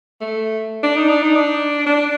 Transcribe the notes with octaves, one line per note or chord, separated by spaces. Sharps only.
A3
D4
D#4
D4
D#4
D4
D4